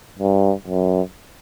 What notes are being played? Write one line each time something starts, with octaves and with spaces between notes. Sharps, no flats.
G2
F#2